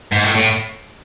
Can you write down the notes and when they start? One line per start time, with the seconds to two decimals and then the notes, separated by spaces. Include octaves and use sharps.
0.12 G#2
0.24 A2
0.35 A2